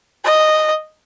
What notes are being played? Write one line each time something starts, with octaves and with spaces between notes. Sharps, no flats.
D#5